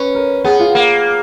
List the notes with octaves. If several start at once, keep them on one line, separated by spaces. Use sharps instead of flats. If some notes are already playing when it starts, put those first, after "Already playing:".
Already playing: C#4 B4
A#4
B3 G#4
F4
A#3